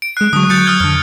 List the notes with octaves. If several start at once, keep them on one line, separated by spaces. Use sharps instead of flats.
D7
G#3 F#6 C7
D3 F#3 C#6 D#6
F#3 G6 A6 C#7
D#6 F6 G#6
F2 D3 F6